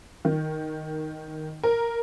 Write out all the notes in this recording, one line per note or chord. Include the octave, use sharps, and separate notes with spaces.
D#3
A#4